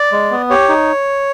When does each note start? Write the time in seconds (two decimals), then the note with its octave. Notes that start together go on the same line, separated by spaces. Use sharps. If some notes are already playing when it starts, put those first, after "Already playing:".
Already playing: D5
0.12 G#3
0.31 B3
0.50 G4 C#5
0.69 D#4